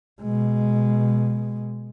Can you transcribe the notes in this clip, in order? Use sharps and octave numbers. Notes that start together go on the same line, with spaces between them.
B2 G#3